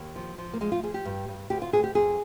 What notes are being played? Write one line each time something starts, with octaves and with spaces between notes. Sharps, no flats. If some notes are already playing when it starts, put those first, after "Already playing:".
Already playing: D#2
F3
F3
A#3
F3 G#3
F4
F3 G#4
G4
G2
G2
D2 G4
F4
D2 G#4
G4
F2 G#4